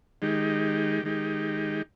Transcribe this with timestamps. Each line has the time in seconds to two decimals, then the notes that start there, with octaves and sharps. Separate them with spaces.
0.22 D#3 G#3 D#4 G4
1.03 D#3 G#3 D#4 G4